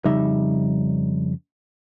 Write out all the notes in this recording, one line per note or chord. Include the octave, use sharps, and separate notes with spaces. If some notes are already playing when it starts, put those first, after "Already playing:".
F2 C#3 G3 D#4 E5